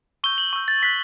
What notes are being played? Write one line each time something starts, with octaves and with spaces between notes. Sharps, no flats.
C#6 E6 G6 G7
F#7
C#6 E6 G6
A6
C#6 F#6 B6